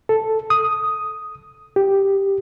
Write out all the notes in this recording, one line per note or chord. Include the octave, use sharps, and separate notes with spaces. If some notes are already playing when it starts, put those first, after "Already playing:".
A4
D#6
G4